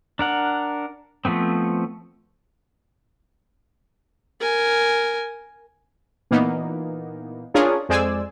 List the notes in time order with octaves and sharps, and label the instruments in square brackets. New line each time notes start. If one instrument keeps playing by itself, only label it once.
[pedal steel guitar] D4 A#4 F#5
F3 A3 B3 C4
[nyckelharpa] A#4 G#5
[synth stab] A#2 E3 A#3 B3 D#4
C#4 D4 F4 G#4 A#4 C#5
F2 G#3 C5 D5 G#5 E6